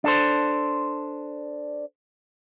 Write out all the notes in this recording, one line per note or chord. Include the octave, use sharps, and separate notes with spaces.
D4 A4 C5